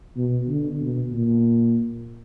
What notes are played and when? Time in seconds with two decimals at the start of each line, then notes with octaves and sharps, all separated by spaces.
0.17 B2
0.49 D3
0.80 B2
1.12 A#2